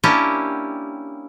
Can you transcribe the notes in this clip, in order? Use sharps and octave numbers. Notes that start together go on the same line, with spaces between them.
A#3 C#4 D4 E4 G4